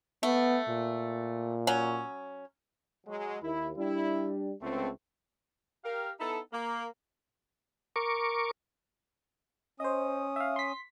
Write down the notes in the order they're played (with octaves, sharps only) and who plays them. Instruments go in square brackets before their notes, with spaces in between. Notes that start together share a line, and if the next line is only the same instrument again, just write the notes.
[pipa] A3 [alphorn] B3
[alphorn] A#2
[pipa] F#3 C#4
[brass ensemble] F#3 G#3
[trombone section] D#2 [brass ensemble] E4
[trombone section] G3 D4 [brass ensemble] E4
[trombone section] C#2 [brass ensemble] D3 A3 C4
[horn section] G4 A#4 F5
B3 D#4 E4 A4
A#3
[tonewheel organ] A#4 C#6 D6
[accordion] C#4 D#6 [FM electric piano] C5 D#5
[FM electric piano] E5 F5
C6 B6